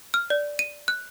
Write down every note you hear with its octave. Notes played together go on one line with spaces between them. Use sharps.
F6
D5
D#7
F#6